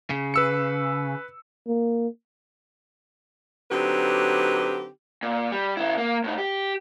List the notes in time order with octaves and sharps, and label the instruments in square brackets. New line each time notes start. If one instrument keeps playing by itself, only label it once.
[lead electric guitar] C#3
[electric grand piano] B4 E6 C#7
[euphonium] A#3
[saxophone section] D3 F#3 C4 D#4 G4 B4
[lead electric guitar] A#2
G3
C#3 E4
A#3
A2 D#4
G4